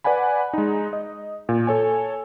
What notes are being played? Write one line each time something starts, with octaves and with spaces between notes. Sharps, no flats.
B4 D5 F#5 G#5 B5
G#3 D#4
D#5
A#2
A4 C#5 G#5